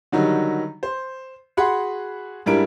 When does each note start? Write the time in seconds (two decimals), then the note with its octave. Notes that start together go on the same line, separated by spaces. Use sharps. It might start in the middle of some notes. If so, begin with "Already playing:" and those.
0.12 D3 D#3 F#3 G3 D#4
0.83 C5
1.57 F#4 G#4 F#5 B5 C6
2.46 G#2 G3 D4 E4 A#4 D7